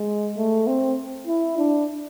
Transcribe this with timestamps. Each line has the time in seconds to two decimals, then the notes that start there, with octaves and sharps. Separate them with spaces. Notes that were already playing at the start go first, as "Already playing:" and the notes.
Already playing: G#3
0.37 A3
0.67 C4
1.27 E4
1.58 D4